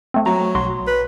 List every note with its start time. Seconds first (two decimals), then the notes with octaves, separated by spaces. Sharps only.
0.14 A3 C4
0.26 F#3 A#5
0.55 B1 F#4 C6
0.87 B4